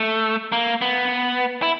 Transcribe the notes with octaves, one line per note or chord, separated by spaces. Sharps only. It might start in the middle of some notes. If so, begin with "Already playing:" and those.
Already playing: A3
A#3
B3
E4